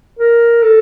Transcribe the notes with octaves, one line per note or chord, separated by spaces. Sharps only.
A#4
A4